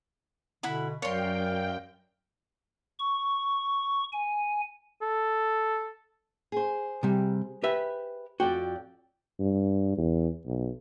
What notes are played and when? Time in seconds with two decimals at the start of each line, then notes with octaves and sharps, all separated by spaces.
0.63 B2 D3 E4 F#5 B5
1.02 F#2 A#4 C#5 D5 F5 G5 C6
2.99 C#6
4.13 G#5
5.02 A4
6.52 G#4 C5
7.03 C3 G3
7.63 G4 B4 E5
8.40 F2 F#4 D5 G5
9.40 G2
9.97 E2
10.46 B1